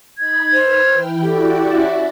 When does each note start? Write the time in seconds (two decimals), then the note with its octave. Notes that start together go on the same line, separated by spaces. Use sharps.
0.18 D#4 B5 G#6
0.53 B4 C5 E6 F6
0.89 E3 E4 G5
1.22 E4 F#4 G4 A4 D5 G5
1.74 C#4 E5